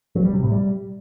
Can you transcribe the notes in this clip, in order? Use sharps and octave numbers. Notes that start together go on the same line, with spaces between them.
F#3
G3
C3
A2
G3